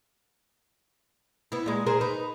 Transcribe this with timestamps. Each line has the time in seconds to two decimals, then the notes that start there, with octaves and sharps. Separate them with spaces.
1.52 B3 E4
1.66 A#2 G#3
1.86 G#4 A#4 C5
2.01 D#4 B4